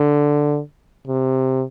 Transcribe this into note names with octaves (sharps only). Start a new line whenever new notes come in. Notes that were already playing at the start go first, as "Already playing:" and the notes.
Already playing: D3
C3